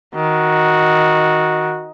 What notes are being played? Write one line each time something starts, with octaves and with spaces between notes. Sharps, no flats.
D#3 F#4